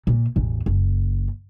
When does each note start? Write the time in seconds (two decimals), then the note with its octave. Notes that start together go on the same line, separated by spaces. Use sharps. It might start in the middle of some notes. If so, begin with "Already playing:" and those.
0.07 A#2
0.36 A1 E2
0.66 F#1